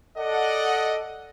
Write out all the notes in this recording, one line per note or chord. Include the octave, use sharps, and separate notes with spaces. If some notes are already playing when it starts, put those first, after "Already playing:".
A4 D5 D#5 F#5